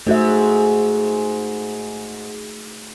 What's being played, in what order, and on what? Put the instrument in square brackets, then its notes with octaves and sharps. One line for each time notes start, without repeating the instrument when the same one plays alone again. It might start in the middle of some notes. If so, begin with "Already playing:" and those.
[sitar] G#2 [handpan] A3 F#4 E5